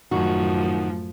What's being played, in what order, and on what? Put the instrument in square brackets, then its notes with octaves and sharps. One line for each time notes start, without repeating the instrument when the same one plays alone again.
[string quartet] F#2 A2 F3 [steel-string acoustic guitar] D#3 F#4